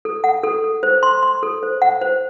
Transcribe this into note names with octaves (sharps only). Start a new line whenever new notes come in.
A4
F#5
A4
A4
C5
C6
C6
A4
C5
F#5
C5